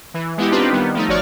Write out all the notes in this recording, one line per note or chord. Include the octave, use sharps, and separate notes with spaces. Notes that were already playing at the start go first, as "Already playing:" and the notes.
E3
G#3 B3 E4 G4
C4 D4 D#4 F4 G4 B4
D#3 G3 B3
F3 A3 D#4
G#1 F3 F#4 C#5 D5 F6